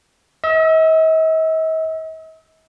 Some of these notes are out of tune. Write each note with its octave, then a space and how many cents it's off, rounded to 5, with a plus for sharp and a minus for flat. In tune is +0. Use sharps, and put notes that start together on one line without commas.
D#5 +45 E6 +0